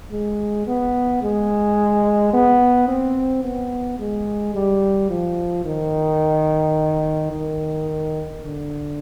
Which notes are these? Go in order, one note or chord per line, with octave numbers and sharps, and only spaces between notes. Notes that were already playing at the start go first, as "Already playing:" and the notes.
G#3
B3
G#3
B3
C4
B3
G#3
G3
F3
D#3
D#3
D3